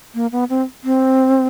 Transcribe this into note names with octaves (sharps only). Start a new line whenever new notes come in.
A#3
B3
C4
C4